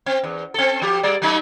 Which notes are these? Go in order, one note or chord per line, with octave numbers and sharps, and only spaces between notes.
C4
E2
C4 A4
F3 G4
G3 D5
F#3 A3 D#4